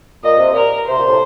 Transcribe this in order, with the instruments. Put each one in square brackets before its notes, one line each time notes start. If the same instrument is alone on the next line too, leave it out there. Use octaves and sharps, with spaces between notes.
[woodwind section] A#2 [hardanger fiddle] D#5
[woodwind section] C3
[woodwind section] A#2 [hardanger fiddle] A#4
[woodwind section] C3 [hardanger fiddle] C5
[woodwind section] A#2
A2 C3